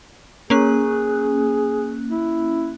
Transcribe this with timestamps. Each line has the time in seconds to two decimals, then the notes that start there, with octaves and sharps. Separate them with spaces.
0.50 A#3 C#4 G#4 F#6
2.10 E4